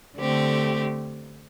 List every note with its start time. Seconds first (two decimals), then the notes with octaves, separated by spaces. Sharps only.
0.18 D3 A3 C4 G4